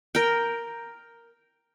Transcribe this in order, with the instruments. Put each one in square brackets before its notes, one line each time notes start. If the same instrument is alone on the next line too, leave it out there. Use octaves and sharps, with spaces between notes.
[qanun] A#4 G5